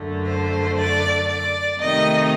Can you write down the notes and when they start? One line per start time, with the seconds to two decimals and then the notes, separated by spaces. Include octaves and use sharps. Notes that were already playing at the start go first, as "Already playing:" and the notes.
Already playing: F#2 D3 A3
0.27 C5
0.78 D5
1.29 D5
1.81 C3 D#3 A3 D#4 D#5